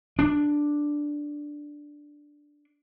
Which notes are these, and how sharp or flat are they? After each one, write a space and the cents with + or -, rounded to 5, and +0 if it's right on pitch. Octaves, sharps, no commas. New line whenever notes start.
D4 +0